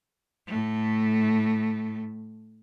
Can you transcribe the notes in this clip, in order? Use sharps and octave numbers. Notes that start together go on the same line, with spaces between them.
A2 A3